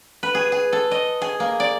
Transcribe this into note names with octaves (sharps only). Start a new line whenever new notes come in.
B4
G#4
G#4
A4
D#5
G#4
A#3
D5